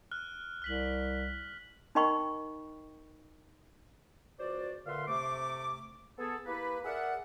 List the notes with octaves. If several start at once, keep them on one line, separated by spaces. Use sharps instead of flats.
F6 F#6
C2 F6 B6 F#7
D#4 A#4 D#5 G5 B5 C#6
C#2 F#4 C5 D5
A#2 D3 B4 E5 F5 C6
C3 A3 D6
B3 G#4 A4
A#3 E4 G4 B4
G#4 A#4 D5 E5 F#5